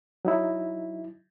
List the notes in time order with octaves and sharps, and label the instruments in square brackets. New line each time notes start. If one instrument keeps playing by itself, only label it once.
[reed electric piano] F#3 D#4 E4